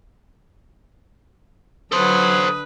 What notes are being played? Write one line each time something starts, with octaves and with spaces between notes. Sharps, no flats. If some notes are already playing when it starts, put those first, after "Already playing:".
D3 F#3 A4 B4 C5 D#6